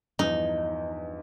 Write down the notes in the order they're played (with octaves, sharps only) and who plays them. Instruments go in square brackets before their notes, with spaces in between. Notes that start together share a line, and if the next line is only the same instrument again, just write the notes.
[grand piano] E2 G2 F3 [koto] D#4